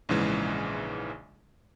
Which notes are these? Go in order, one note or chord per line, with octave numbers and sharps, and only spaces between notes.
A#1 G#2 C#3 E3 G#3